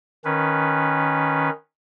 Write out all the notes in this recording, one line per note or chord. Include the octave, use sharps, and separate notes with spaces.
D#3 C#4 B4